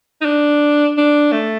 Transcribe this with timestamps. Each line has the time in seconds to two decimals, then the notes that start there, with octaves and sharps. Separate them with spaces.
0.21 D#4
0.25 D4
0.97 D4
1.32 A3